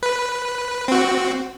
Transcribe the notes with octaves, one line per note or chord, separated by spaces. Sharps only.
B4
C4 F#4